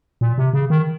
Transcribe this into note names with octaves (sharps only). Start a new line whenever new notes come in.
A#2
C3
C#3
D#3